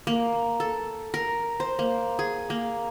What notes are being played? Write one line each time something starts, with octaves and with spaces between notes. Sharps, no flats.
A#3
A4
A#4
C5
A#3
G#4
A#3